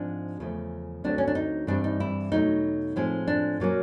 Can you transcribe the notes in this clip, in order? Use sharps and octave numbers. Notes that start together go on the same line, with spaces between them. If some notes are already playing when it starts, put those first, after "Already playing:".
Already playing: G#2 F3 G#3 C4 D4
E2 C#3 F3 A3
D2 D3 F#3 A3 C4 D4
C#4
D4
D#4
G2 E3 G3 C4 D4
D#4
E4
E2 B2 F#3 A3 D#4
A2 F3 G#3 C4
D4
A#2 F#3 A#3 C#4